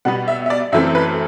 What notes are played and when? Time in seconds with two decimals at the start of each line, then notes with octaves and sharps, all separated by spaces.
0.05 B2 G3 B3 F#5
0.28 E5
0.46 E5
0.50 D5
0.72 F#2 E3 A3 C4 E5
0.95 B4